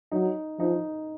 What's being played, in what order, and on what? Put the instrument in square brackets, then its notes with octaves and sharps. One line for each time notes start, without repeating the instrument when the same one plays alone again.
[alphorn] F#3 [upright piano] D#4
[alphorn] F3 [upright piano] D#4